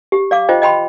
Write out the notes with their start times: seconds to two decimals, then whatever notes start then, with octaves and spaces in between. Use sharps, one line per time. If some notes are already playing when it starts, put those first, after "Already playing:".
0.12 G4
0.31 D5 F5 D6
0.49 F4 C5 D#5 G5
0.62 D#5 G5 B5 C6